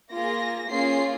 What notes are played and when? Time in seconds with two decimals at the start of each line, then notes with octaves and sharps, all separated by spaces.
0.14 A#3 F4 G#4 A#6
0.70 A#3 C#4 F4 G#4 C7